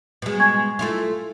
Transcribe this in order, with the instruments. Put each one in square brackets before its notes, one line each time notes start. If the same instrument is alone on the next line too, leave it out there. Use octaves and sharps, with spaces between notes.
[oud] B2 G#3
[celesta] G#5 C#6 G#6
[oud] A3 E4 F4